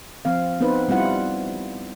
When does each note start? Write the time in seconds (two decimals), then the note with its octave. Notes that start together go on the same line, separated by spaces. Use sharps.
0.25 F3 C4 F5
0.60 B3 C4 D#4 B4 C5
0.89 G3 C4 E4 F4 F#5